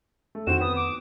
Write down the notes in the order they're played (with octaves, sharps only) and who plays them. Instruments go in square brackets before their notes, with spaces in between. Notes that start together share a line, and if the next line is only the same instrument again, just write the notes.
[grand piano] A3
[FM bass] F2 [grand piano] D#3 C4 F#4 [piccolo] E7
[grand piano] B3 [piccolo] D#6
[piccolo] D6